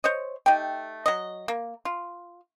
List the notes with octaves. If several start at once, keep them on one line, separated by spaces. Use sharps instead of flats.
C5 C#5 D#5
A3 D#4 G4 G5
F#3 D#5
A#3
F4